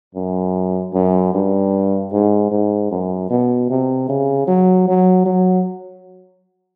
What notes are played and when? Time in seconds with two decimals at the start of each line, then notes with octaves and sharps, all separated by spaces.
0.15 F#2
0.93 F#2
1.34 G2
2.12 G#2
2.51 G#2
2.91 F#2
3.29 B2
3.70 C3
4.09 C#3
4.47 F#3
4.88 F#3
5.26 F#3